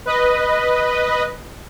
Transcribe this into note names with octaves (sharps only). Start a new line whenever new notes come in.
B4 D#5